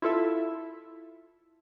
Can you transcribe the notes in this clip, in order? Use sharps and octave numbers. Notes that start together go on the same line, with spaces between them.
E4 F4 A4 E5